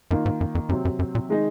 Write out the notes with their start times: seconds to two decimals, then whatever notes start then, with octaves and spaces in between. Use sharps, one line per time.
0.11 F#2 D#3 A#3 F4
0.26 G#2
0.41 F#2
0.55 F2
0.69 F#2 C3 F#3 C4
0.85 F#2
0.99 F#2
1.15 A#2
1.29 D#3 G#3 D#4